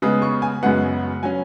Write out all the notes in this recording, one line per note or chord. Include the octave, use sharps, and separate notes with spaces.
C#3 G#3 B3 D#6
C#6
G#5
F#2 C#3 G#3 B3 F#5
F#3 C#4 G#5